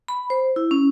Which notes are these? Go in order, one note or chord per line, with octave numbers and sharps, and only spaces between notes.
B5
C5
E4
C#4